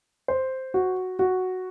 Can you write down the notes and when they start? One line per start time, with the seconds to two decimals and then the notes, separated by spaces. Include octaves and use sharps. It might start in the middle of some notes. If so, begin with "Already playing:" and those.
0.28 C5
0.74 F#4
1.19 F#4